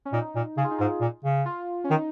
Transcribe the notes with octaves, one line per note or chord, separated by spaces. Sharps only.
C#4
A#2 D#4
A#2
C#3 G#4
F4
D#4
G#2 F4
A#2
C#3
F4
C#4
D#3 D#4